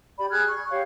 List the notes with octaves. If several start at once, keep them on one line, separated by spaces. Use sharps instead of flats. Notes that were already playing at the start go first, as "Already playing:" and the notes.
G4 D5 B5
G#4 F6 F#6 G#6
C#6
G4 C#5 F5